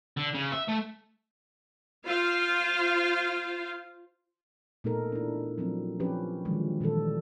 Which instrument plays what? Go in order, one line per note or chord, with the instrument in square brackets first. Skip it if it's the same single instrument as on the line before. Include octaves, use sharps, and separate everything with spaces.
[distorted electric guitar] D3
C#3
E5
A3
[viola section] F4 C5 F5
[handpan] A#2 A3 B3 D#4 A4 A#4
D4 E4
F3 F#3 C4
F3 C4 C#4 G4 B4
D3 D#3 F3 F#3 G#3
A#2 D#3 E3 G3 A4